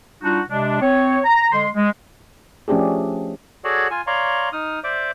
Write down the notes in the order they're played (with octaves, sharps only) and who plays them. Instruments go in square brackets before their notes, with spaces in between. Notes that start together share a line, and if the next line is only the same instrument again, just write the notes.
[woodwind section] G3 D4 D#4 F4 F#4
C3 G#3 D4
C4 C#5
A#5
D3 G#3 C6
G#3
[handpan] F3 A3 C#4 D4 G4 G#4
[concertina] F#4 G#4 A4 C#5 D5 F#5
F4 G#5
C#5 D5 F5 A#5 C6 C#6
D#4 D#6 F6
C5 D5 E5 D6